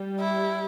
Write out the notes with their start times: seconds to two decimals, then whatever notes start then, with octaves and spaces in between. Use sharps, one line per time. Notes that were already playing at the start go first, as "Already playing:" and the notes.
Already playing: G3
0.20 E4